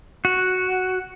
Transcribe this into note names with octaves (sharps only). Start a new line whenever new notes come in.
F#4